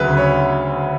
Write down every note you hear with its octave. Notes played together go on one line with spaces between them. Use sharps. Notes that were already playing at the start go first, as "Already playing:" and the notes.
Already playing: D2 C#3 F#3 B4
C#5